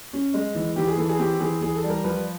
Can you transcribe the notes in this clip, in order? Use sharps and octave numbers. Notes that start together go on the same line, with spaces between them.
C#4
G#3
E3
E3 G4
G#4
E3 A4
G#4
C4 G4
E3 G#4
E3 G#4
A4
G3
A#4
F3 B4